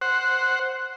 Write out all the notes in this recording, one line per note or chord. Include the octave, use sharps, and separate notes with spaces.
C5 F#5